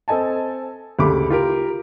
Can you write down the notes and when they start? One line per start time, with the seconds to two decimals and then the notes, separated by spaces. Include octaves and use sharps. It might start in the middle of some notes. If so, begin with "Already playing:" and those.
0.08 C4 A4 D#5 G#5 A5
0.99 D2 C#3 G4 B5 D6
1.30 F4 G4 A#4